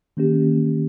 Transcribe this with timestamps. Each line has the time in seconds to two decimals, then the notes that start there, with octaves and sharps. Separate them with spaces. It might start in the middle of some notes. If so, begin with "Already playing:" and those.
0.17 D#3 A#3 C#4 G4